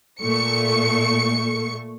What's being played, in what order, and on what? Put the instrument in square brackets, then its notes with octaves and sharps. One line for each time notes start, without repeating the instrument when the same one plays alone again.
[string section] A#2 A3 C#6 C#7